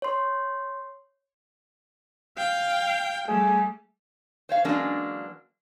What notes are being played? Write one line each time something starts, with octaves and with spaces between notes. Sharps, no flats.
C#5 C6
F5 G5
G3 A3 G#4
C5 C#5 F5
E3 F#3 G#3 A#3 C#4 D4